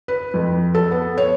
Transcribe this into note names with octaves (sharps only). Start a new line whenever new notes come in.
B4
F2
A4
B3
C#5